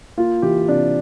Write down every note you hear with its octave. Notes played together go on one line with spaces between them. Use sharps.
A#3 F4
E3 G4
C3 D4